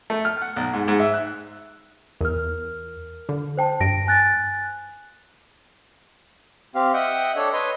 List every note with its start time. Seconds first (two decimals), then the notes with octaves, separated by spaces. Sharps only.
0.10 A3
0.25 F6
0.42 F#5
0.56 B1
0.73 G#2
0.88 G#2
1.00 E5
1.14 F#6
2.21 E2 A#4 F6
3.29 D3
3.57 C5 G5 A5
3.81 G2 A#6 D7
4.07 G#5 F#6 A6
6.75 C4 G4 F5
6.94 D#5 E5 F#5 G5
7.36 D4 A4 C#5
7.53 B4 C#5 D#5 C6